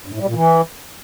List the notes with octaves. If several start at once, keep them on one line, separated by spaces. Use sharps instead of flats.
G2
A2
G3
A#2
E3